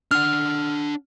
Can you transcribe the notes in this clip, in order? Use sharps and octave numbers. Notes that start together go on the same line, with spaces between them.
D4 F#5 F6